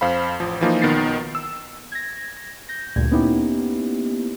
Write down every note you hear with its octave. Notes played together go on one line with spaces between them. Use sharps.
F2 C5 F5 B5
A1 F3
E3 F3 A#3 D#4
B1 D#3 B3 A6 C7
E6
G#6 A#6
G6 A#6
D2 G2 A#2 G#6
A#3 B3 C#4 D#4 E4 G4